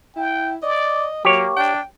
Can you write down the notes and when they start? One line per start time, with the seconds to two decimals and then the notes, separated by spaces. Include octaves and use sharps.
0.16 E4 G5
0.63 D5 D#5
1.25 F#3 A#3 G4 C#5
1.56 D4 G5